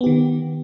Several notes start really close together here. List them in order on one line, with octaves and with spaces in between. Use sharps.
B3 G4 D#3